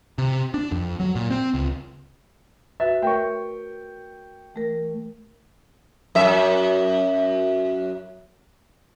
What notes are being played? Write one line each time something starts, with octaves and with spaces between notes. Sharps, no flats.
C3
D4
F2
F#3
A#2
C4
C#2
F#4 B4 E5 A6
A3 A#4 C#5 G5 C#6
E3 A3 A#4
F#2 E5